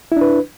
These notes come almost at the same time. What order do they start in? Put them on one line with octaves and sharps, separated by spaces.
E4 D4 B4